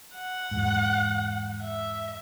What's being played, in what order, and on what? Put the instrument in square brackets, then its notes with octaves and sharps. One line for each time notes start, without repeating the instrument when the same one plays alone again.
[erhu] F#5
[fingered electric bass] E2 G#2
[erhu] E5